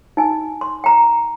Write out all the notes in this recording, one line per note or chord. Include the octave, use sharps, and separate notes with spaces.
D#4 G#5
C6
G5 A#5